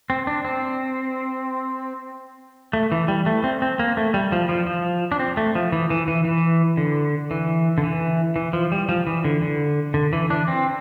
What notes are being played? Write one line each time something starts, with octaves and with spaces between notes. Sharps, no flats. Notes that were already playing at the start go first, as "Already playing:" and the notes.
C4
D4
C4
A3
E3
G3
A3
C4
C4
A#3
A3
G3
F3
F3
F3
D4
C4
A3
F3
E3
E3
E3
E3
D3
E3
D3
E3
E3
F3
G3
F3
E3
D3
D3
D3
E3
D4
C4